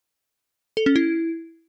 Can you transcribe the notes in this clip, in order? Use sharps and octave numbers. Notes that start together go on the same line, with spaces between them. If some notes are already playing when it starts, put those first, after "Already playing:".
A4
C#4
E4